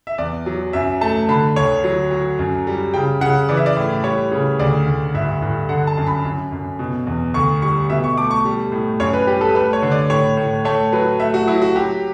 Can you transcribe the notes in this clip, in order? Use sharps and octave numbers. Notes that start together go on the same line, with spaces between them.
E5
E2 D5
F#3
F#2 E5
A3 A5
D3 B5
D2 C#5
F#3
F#3
F#2
G3
C#3 G5
C#3 F#5
E3 D5
E5
D5
A2
G3 C#5
C#3
D2 D5
D2
G2 E5
G2
D3 F#5
A5
F#2
B5
F#2
F#2
B2
E2
D2 C#6
G3 C#6
B2 E5
C#6
A3 D6
C#6
G3
A2
F#2 C#5
B4
G3 G4
A4
A3 B4
C#5
D3
D5
A2 C#5
A2
A3 C#5
F#3 B4
A3 E5
F#4
F#3 E4
F#4
F#3 G4